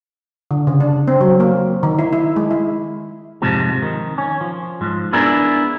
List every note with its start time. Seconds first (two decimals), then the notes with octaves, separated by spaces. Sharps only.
0.51 D3
0.67 C#3
0.80 D4
1.08 C4
1.21 F#3
1.40 A#3
1.83 D#3
1.99 E4
2.13 E4
2.36 G#3
2.51 E4
3.42 F2 G#2 C3 F3
3.82 D#3
4.18 C#4
4.41 F3
4.81 G#2 F3
5.13 B3 D4 E4 G#4 A#4